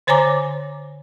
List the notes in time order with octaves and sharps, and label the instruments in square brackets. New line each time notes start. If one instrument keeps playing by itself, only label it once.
[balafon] D3 C5 C#5 G#5 A#5 D6